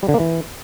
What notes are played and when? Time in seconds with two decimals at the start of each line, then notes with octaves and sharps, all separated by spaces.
0.03 G3
0.09 D3
0.14 A#3
0.20 E3